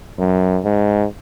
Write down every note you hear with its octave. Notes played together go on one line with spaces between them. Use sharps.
F#2
G#2